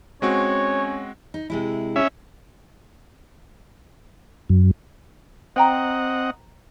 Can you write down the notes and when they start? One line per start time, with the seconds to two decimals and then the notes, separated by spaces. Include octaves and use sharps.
0.22 G#3 C4 C#4 F#4 C#5
1.34 D#4
1.50 C3 G#3 E4
1.96 C#4 E5
4.50 F#2
5.56 C4 C5 D#5 F#5 G5 A#5